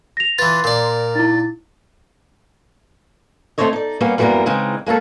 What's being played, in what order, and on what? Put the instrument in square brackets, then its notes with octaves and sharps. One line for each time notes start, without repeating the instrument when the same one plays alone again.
[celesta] A#6 F7
[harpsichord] E3 F4 [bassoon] B4 [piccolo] C6 [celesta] A6
[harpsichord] A#2 D5 [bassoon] A#4
[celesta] D#4 E4 [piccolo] A6
[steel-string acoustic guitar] A3 C4 C#4 C5 C#5 D#5
D#4 D5
G3 A#3 B3 C#4
F#2 E3 G3 A#3 B3 A#4
C#3 E3 G#3 C4 D#4
G#3 A#3 C#4 A4